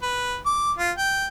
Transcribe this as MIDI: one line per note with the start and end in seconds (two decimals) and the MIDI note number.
0.02 0.37 71
0.46 0.72 86
0.78 0.92 65
0.98 1.28 79